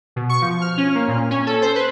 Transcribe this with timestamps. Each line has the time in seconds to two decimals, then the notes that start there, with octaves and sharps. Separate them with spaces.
0.16 B2
0.29 C#6
0.42 F3
0.61 F6
0.78 C#4
0.95 A#3
1.08 A#2
1.31 C#4
1.47 A4
1.62 C5
1.75 B4